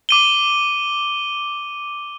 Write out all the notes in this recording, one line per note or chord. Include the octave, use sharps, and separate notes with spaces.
D6 D#7 G7